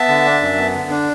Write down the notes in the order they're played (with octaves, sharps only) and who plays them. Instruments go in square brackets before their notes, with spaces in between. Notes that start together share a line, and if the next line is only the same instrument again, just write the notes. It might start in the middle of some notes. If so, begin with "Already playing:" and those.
Already playing: [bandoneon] B3 E5 A5
D3
D4
F#2
B3
D3
D4